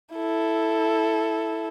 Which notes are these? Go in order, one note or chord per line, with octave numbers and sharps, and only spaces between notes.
E4 A4